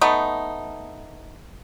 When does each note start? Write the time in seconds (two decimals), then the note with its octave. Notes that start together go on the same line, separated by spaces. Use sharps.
0.01 A3 B3 D#4